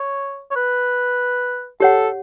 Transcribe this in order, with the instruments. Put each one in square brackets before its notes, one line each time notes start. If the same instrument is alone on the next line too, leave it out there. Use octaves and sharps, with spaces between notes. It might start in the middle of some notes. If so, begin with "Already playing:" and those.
Already playing: [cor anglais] C#5
C#5
B4
[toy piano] G4 C#5 F#5 [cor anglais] A4